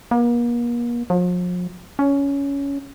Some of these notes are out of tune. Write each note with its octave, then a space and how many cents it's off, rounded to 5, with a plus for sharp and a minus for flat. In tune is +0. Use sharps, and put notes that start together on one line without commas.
A#3 +40
F3 +40
C#4 +15